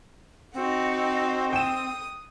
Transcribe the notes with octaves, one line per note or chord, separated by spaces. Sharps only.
C4 D#4 F#4
G5 D#6 E7